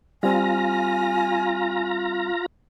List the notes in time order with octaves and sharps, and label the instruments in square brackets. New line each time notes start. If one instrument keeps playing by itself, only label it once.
[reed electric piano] G3 C4 [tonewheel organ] F4 A#5 [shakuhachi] G#5